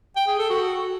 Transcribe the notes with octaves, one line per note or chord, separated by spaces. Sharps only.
G5
G#4
A4
F#4